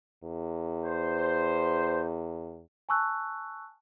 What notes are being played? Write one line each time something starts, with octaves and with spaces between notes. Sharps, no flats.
E2
C5
G#5 A5 C#6 E6 F#6